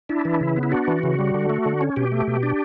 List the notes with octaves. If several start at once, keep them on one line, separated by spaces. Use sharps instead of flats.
D4 E4
E3
C#3
B3
E4
D4 F#4
E3
C#3
G3
D3
A3
D3
C#4
B2 G4
A3
B2
D4